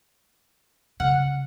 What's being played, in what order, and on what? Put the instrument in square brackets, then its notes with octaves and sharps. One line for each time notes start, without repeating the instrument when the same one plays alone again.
[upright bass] C#3 G3 [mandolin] F#5 F6